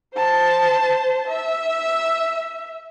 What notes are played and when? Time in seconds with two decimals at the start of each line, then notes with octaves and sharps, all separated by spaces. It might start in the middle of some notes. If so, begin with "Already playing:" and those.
0.15 C5 A5
1.28 E5